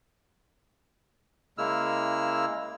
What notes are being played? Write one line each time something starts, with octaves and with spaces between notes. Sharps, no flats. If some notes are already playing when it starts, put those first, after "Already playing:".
C#3 G#3 A#3 E4 E6 F6